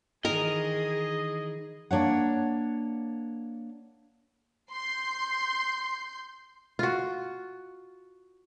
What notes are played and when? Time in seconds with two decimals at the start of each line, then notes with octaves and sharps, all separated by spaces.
0.25 D#3 E3 G#4 A#4 D#5
1.91 A#3 D4 C#5 F#5
4.73 C6 G6
6.79 F4 F#4